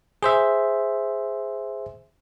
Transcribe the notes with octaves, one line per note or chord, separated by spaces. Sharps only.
G#4 C5 E5